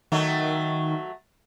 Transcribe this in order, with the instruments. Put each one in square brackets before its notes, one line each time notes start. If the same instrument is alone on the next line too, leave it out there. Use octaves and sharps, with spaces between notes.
[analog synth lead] D#3 [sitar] F#3 A3